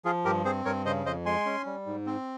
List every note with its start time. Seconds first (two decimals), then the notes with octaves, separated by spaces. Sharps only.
0.05 F3 F4 G#4
0.25 G2 G4 A#4
0.45 C4 G#4 C5
0.65 G2 A#4 C#5
0.85 C#3 C5 D#5
1.06 F2 C5 D#5
1.26 G#3 G#5 C6
1.46 C#4
1.66 G3
1.86 G#2
2.06 C4